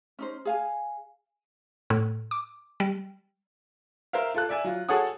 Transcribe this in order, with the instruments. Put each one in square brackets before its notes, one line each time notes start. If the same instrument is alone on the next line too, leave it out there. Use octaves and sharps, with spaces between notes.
[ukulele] C#4 D#4 C5
G#4 F5 G#5
[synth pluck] A2
D6
G3
[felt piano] A#4 C5 E5 F5
F4 A4 F#6
D5 E5 G#5
F#3 F4
F#4 G#4 A4 C#5 F#5 D#6